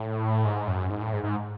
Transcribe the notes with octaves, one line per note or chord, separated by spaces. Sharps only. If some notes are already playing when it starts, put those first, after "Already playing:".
Already playing: A2
G#2
F#2
G#2
A2
G#2
G#2